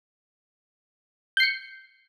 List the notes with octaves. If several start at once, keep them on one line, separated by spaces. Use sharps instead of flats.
G6 C7 C#7